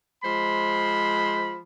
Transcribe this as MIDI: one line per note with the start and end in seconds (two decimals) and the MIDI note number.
0.24 1.60 53
0.24 1.60 56
0.24 1.60 72
0.24 1.60 83